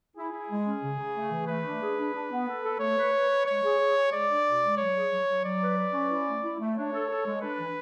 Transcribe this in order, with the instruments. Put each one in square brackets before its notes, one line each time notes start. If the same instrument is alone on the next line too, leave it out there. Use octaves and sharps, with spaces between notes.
[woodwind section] E4 [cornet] G#4
[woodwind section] E4
G#3
C#4
C#3
C#3
A3
E3
[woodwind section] A3 [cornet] B4
[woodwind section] D4
G#4
D4
D4
B3
A4
A4
[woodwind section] A3 [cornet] C#5
[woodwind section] B4
B4
B4
[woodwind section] G#3 [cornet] C#5
[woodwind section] G#4
G#4
G#4
[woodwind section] G#3 [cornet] D5
[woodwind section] D4
B2
G#3
[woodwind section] F#3 [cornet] C#5
[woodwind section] G#4
F#3
F#3
[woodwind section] F#3 [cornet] D5
[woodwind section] B4
B4
C#4
E4
A3
E4
A3
[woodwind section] D4 [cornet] C#5
[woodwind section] A4
A4
G#3
[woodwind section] D4 [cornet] B4
[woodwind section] E3